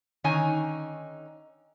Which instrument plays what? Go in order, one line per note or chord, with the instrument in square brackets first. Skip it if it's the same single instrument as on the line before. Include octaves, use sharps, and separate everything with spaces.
[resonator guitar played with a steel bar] D3 D#3 C#4 D#4 C#5 G#5